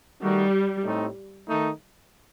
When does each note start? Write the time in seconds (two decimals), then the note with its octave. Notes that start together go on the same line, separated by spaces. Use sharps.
0.22 D#3 G3 A3 D#4 F#4
0.85 A2 A3 C4 D#4
1.48 D#3 A3 D#4